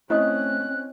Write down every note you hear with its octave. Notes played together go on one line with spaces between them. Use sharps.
A3 C4 C#4 E4 D#5 D#6 F#6